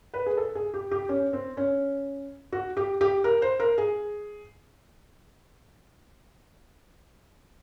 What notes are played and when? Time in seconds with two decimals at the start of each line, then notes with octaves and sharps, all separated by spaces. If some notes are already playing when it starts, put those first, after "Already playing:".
0.14 B4
0.26 G#4
0.37 A4
0.55 G#4
0.74 G4
0.91 G4
1.09 C#4
1.33 C4
1.57 C#4
2.52 F#4
2.77 G4
3.01 G4
3.24 A#4
3.42 C5
3.60 A#4
3.78 G#4